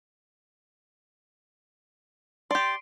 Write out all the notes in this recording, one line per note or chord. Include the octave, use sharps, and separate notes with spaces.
G4 D5 C6